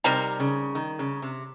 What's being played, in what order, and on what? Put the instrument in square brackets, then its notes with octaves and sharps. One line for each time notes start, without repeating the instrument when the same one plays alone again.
[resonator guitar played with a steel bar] C3 [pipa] G3 C4 D#4 A#4
[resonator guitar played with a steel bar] C#3
D#3
C#3
C3